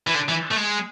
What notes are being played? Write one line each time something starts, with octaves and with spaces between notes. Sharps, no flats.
E3
D3
E3
A3
G#3